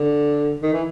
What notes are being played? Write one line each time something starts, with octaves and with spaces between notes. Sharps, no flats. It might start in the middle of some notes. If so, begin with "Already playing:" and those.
Already playing: D3
D#3
E3